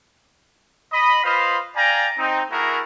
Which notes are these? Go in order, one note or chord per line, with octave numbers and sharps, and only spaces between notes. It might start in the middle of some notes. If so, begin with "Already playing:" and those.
D#5 B5
F4 B4 C5 D#5 F5 B5
D5 F5 G5 G#5 A#5
C4 D#4
A3 E4 F#4 G#4 A#4